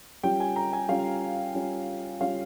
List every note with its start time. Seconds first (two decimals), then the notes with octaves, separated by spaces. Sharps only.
0.23 G3 C#4 F4 G5
0.40 G#5
0.56 A#5
0.73 G#5
0.89 G3 C#4 F4 F5
1.55 G3 C#4 F4
2.20 G3 C#4 F4 F5